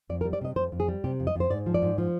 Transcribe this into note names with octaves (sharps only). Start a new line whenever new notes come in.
F2 D5
A#4
G3
D5
C3 D#5
F2 C5
F2
G#4
G3
C3 G4
F2
D#5
F2 C5
G#2 D5
F3
D5
G#2
F3